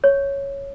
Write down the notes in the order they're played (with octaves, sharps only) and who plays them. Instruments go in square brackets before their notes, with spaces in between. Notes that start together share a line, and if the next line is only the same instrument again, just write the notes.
[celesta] C#5